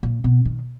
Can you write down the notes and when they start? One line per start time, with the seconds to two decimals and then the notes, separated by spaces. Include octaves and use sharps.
0.03 A#2
0.24 B2
0.45 D#3